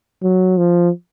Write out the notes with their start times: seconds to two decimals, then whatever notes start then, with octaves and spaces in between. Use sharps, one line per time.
0.23 F#3
0.58 F3